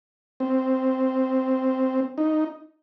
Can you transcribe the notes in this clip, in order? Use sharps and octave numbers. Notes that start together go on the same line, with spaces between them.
C4
D#4